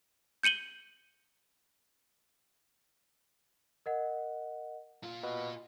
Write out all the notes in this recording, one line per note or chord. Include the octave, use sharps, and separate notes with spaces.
G6 C#7 D#7 F#7 G7
A#4 D#5 F#5
A#2 F4
B2